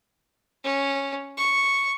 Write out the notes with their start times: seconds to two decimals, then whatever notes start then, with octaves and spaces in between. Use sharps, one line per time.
0.64 C#4
1.37 C#6